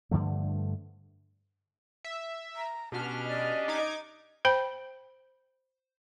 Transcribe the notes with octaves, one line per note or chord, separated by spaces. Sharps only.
G2 D3 F3 A3
E5
A#5
B2 C#4 D4 G4 A5 F6
D5 D#5
D#4 D6 G#6
C5 G5 B5